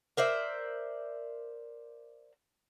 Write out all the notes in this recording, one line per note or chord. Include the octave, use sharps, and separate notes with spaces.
A#4 C5 D5 E5